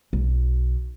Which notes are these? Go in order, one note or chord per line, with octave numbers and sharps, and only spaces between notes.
B1